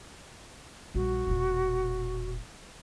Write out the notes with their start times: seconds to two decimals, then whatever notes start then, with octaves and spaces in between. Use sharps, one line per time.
0.95 A#1 G3 F#4
1.27 E1 A#2